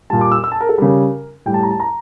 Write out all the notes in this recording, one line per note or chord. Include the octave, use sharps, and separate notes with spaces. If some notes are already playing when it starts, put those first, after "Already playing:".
A#2 G3 A5
D6
E6
E6
A5
A#4
A4
C#3 G3 A#4
A2 G3 G5
A5
A#5
A5
A#5